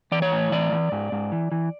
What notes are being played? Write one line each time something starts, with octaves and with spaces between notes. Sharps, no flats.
E3 D5
C#5
A2
E3 D5
E3
G#2
G#2
E3
E3